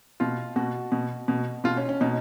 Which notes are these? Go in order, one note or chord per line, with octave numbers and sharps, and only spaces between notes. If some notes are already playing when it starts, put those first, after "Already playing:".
B2 F4
B2 F#4
B2
B2
B2 F4
C#4
C#4
B2 D#4